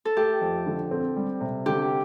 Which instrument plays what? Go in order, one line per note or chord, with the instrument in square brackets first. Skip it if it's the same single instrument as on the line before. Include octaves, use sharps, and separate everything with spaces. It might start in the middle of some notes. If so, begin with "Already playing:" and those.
[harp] A4
[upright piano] A3 [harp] G4
[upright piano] F2
D3
C4
G3
C3
[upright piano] D3 [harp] G4